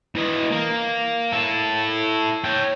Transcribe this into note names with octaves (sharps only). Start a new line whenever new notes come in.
E3 D#5
A#3
E4 A4
C#5 G5